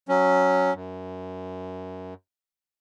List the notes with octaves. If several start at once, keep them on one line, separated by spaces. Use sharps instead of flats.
F#3 C#4
F#2